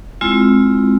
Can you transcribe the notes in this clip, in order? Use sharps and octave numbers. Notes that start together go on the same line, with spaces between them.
G#3 C4 E4 F4